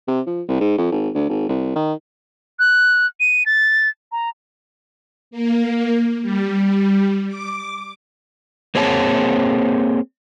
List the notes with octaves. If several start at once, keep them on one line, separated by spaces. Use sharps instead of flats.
C3
F3
C2
G#2
F2
G#1
D2
G#1
C2
D#3
F#6
D#7
A6
A#5
A#3
G3
D6
A#3 C4 G#4 C#5 A5